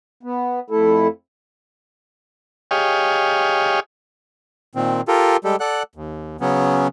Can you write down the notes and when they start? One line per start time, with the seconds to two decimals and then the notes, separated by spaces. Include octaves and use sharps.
0.23 B3
0.70 F2 A3 E4 A4
2.71 G4 G#4 C#5 D#5 F5
4.75 A#2 D#3 C4
5.08 F4 G4 A4 A#4
5.44 G3 G#3 G4 A4
5.60 A4 D5 F#5 F#6
5.95 D#2
6.41 C#3 F#3 B3 C#4